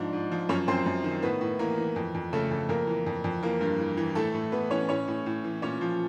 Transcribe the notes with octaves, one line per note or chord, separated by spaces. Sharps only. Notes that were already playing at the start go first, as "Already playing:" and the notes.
Already playing: G#2 F3 D4 D5
G#2
F3
F#2 C#4 C#5
F#2 C4 C5
F#2
D#3
A2 B3 B4
A2
E3 A#3 A#4
E3
F2
F2
C#3 A3 A4
F2
F2 A#3 A#4
E3
F2
F2
E3 A#3 A#4
G2
E3
E3
A2 A3 A4
A2
E3 B3 B4
E3 C#4 C#5
A2 C#4 C#5
A2
A2
E3
A#2 C#4 C#5
F3